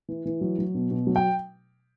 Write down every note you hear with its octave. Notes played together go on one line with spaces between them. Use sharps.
E3
E3
F#3
F#3
B2
B2
F#3
G5